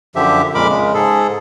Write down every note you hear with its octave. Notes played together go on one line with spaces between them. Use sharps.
F#2 D3 F3 G4 E5
F2 A#2 G#3 A#4 B5 D6
C#3 G#3
G#2 G#4 A4